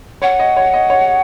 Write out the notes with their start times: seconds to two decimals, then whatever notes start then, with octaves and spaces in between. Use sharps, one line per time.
0.22 C#5 F#5
0.39 D#5
0.57 C#5
0.74 D#5
0.90 C#5